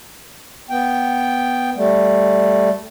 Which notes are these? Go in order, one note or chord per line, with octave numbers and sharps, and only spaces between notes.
B3 G5
G3 A3